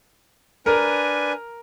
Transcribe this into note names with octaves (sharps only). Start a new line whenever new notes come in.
D4 A#4 B4 G#5